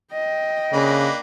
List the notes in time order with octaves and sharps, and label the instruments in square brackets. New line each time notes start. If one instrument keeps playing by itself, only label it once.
[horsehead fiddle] D#5 G5
[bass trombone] C#3 [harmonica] A#3 D4 B4